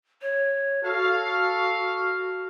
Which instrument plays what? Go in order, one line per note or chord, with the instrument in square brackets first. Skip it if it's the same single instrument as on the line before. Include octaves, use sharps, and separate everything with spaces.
[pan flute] C#5
[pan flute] F#4 [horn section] A4 F5